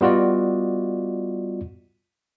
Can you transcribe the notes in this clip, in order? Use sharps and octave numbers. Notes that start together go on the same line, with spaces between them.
G3 B3 F4 F#4 D5 D#5